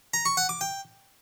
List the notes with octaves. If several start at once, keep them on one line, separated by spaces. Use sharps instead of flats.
A#5
C#6
F#5
D6
G5